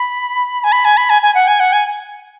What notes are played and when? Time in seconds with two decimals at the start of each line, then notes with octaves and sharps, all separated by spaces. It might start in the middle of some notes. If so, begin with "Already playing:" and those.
Already playing: B5
0.64 G#5
0.72 B5
0.85 G#5
0.97 B5
1.10 G#5
1.22 G#5
1.35 F#5
1.48 G#5
1.60 F#5
1.73 G#5